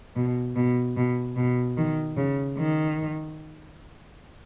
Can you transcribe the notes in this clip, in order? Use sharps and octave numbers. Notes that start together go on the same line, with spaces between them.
B2
B2
B2
B2
D#3
C#3
D#3